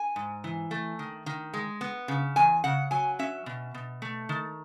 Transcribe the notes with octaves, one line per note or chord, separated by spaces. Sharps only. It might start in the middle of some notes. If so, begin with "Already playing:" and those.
Already playing: G#5
G#2
E3
A3
D#3
D#3
G#3
B3
C#3
E2 G#5
C#3 F#5
F#3 G#5
C#4 E5
B2
B2
A3
D#3